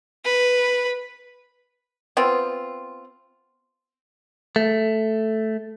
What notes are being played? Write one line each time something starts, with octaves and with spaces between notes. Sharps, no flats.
B4
B3 C4 F4
A3